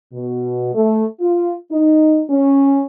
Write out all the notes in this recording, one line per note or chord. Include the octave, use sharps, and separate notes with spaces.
B2
A3
F4
D#4
C#4